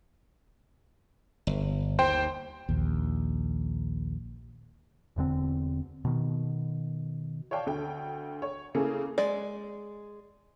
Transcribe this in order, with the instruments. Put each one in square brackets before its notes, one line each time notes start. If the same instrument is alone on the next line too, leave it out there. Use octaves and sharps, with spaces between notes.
[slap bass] G1
[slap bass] D#2 [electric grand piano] C5 G5
[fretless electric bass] A#1 D#2
[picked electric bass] E1 E2 D3 C4
B2 D#3
[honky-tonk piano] C#5 D5 F5 G5 A5 D6
D2 D3 G5
C#5
C#3 A3 A#3 E4 G#4
[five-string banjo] G#3 D5